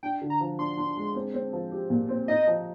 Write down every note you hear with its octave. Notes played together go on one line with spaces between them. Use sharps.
D4 G5
D3
A#5
F3
D4 C6
D4
G#3
C4
C4
F3
G4
A#2
C4
D#4 D#5
F3